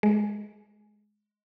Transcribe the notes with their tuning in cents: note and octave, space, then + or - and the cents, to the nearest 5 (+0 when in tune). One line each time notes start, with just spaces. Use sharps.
G#3 +10